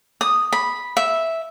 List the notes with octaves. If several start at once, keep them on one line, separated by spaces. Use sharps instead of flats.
D#6
B5
E5